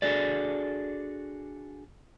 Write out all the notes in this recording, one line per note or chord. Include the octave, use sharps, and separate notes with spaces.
D4 F#4 G#4 A4 D5